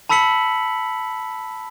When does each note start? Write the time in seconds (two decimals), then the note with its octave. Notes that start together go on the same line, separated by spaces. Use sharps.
0.09 A5 B5 E6 B6 C#7 F#7